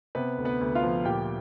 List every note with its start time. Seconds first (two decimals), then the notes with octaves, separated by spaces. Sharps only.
0.15 C3 B3 B4
0.37 D2
0.45 B3 B4
0.61 D2
0.75 F4 F5
0.83 F3
1.05 A#2 G4 G5